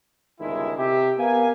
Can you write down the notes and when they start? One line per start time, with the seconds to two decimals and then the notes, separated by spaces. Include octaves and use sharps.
0.40 G1 C#2 D#3 G#3 E4
0.77 C3 G4 E5
1.19 B3 A#4 F5 G#5